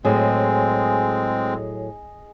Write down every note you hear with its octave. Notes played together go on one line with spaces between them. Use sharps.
A2 F#3 G#3 C4 G#4 D#5